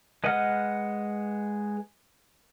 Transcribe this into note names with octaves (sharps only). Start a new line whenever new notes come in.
G#3 B4 D#5 F#5 F6